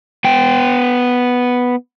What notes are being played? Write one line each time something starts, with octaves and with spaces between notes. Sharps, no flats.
B3 G5